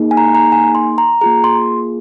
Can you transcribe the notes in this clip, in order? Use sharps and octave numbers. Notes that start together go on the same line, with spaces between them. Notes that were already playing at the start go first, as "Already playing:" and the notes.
Already playing: A#3 D#4 G#4
G#5
A#5
A#5
G#5
C6
A#5
A#3 F4 G#4 A#5
C6